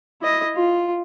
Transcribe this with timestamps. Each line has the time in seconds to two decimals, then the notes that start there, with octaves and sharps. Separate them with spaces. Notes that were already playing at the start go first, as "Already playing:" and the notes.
0.21 E4 D#5
0.56 F4